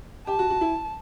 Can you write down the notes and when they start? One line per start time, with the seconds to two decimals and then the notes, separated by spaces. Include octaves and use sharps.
0.27 G4 A5
0.39 F#4
0.50 F#4
0.61 E4